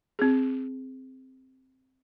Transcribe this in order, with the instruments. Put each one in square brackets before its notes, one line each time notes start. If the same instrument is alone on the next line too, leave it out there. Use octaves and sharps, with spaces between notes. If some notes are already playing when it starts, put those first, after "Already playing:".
[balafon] C4 G#4